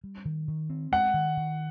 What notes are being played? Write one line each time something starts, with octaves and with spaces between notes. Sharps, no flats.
G3
D#3
D#3
C4
G#3 F#5
D#3
D#3